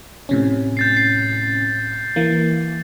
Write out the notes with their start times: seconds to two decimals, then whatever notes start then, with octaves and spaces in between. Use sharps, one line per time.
0.29 A2 C3 C#4
0.77 G6 A6 C7
0.95 A6 C7
2.16 E3 A#3